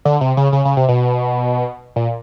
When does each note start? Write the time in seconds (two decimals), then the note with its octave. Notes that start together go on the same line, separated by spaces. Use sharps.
0.05 D3
0.21 C3
0.37 C#3
0.53 C#3
0.65 C#3
0.77 C3
0.89 B2
1.96 A#2